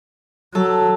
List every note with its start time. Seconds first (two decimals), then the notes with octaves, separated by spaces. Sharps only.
0.55 F#3 A4